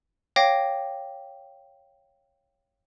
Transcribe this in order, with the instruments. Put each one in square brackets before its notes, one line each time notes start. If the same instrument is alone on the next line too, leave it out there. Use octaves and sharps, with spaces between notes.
[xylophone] C#5 F5 G5 D6 A#6